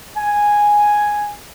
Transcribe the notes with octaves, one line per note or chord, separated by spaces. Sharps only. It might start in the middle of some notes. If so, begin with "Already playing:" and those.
G#5